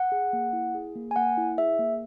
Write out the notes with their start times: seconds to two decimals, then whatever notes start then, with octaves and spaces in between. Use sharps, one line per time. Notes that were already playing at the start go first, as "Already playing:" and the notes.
Already playing: F#5
0.12 G#4
0.33 A#3
0.53 E4
0.75 G#4
0.95 A#3
1.11 G#5
1.16 A#3 F#5
1.37 E4
1.58 G#4 E5
1.79 A#3